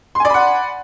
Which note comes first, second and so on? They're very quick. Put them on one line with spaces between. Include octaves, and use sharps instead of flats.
C6 G#5 D5 B5 F#5